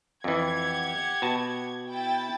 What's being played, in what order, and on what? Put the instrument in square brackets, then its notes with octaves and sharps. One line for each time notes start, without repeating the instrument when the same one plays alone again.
[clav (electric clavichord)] F2 E3 [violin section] G4 F#5 G#6
[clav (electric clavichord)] B2 F#4 A5
[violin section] E4 G5 A6